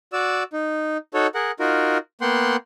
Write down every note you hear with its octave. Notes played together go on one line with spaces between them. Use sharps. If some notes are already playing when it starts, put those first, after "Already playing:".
F#4 D5 E6
D#4
D#4 F#4 A4 C#5
G#4 A#4 F#5
D#4 F4 F#4 A#4
A#3 B3 F#5 G5 C6